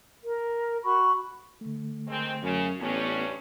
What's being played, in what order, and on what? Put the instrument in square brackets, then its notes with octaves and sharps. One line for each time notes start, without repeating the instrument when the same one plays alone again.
[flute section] A#4
F#4 B5 C#6
[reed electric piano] D3 A3
[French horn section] D#3 G#3 C4
[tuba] F#2 [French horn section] C#3
[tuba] A1 [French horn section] G2 C#4 [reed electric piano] B3